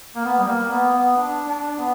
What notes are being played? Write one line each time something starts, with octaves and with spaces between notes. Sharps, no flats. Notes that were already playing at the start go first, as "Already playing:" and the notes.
A#3
B3
G3
A#3
B3
B3
D4
D4
B3